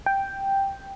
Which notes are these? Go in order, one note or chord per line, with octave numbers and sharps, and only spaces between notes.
G5